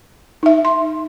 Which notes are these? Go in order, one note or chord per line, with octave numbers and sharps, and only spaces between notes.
D#4 E5
C6